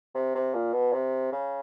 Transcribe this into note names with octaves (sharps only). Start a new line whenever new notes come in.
C3
C3
A#2
B2
C3
C#3